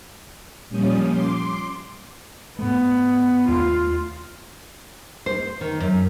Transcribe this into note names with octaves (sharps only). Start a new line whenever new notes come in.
A#2 F3 G3 C#4 D#6
C6 D6
G#2 A3 B3
D#2 A3 D4 F4
C5
D#3
F#2